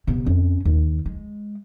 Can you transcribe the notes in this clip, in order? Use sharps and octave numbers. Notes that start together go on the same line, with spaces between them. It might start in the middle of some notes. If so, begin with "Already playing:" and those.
C3 B3
F2 C#4
D#2
G#3